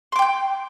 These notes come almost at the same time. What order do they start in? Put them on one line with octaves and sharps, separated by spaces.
C6 D6 G5 G6